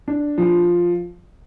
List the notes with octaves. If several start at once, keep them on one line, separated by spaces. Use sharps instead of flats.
D4
F3